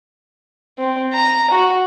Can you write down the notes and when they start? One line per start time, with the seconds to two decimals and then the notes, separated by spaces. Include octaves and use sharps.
0.78 C4
1.13 A#5
1.51 F#4